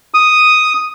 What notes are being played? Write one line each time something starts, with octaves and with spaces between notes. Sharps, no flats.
D#6